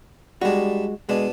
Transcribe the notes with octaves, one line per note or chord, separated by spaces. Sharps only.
G3 G#3 D4 F#4
B2 G#3 D4